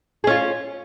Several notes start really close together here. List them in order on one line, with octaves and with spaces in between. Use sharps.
G#4 C#4 F4